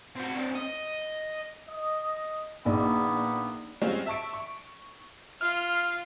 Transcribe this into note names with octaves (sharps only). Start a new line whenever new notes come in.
C4 F#4
C4 D4
D#5
D#5
A#1 A#3 B3 D#4 D5
G3 G#3 C4 C#4 F4 F#4
E5 A5 C#6 D7
C#6
F4 F6